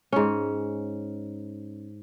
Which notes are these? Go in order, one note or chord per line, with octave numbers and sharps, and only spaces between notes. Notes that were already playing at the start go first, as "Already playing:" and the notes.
G#2 C#4